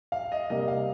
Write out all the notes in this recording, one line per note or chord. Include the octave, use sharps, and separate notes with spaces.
F5
D#5
C3 G3 A#3 D#5
F5